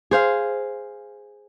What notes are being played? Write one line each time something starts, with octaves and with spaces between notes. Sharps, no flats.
G#4 C5 F5